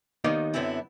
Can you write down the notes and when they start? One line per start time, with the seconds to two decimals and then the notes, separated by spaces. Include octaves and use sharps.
0.24 D#2 D#3 B3 D#4 D5 F5
0.54 F#2 D3 B3 C4 E4